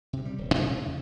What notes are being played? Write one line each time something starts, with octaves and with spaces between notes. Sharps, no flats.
G2 C3
G3
D#1
A1 G#2 C3 G3
E2
C#3